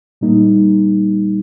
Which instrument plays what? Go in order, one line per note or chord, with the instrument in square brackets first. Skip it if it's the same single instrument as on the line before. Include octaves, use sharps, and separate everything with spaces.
[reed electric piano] A#2 G3 A#3 D#4